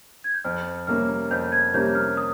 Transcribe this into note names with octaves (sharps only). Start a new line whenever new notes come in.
G#6
G6
F2 F6
C3 G3 A#3 C#4 F6
F2 G6
G#6
C3 G3 A#3 C#4 G6
F6
D#6